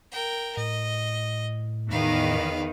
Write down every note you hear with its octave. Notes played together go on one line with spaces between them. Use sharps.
A#4 G5
A2 D#5
E2 D#3 B4 F5